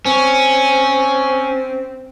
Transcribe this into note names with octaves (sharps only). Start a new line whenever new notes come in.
C4 C#4